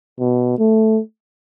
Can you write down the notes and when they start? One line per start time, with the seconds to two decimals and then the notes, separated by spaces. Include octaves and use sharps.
0.20 B2
0.58 A3